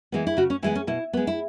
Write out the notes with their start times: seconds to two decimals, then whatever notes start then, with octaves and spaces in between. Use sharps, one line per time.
0.12 E3 G#3 B3
0.27 E4
0.37 C#3 F#4
0.50 C#4
0.62 E3 G#3 B3 E4
0.75 C#4
0.87 B2 E4
1.13 G#3 B3
1.27 E4